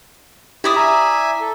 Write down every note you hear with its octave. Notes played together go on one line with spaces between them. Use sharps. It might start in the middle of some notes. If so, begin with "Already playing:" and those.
E4 G4 D5 D#6
E5 G#5 A#5
A4